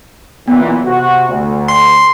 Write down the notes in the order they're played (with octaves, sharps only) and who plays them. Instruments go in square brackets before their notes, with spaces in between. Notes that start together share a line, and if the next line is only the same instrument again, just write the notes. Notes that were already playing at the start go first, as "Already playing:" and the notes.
[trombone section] B1 A#2 E3 [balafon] B3
[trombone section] C3 F#4
D2
[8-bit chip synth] C6